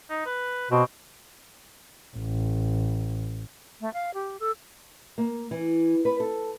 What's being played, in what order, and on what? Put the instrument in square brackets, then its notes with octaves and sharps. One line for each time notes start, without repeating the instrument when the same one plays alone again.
[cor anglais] D#4
B4
[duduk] B2 [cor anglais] C4
[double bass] A1
[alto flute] A3
F5
G4
A4
[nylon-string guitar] A#3
E3
B4
A4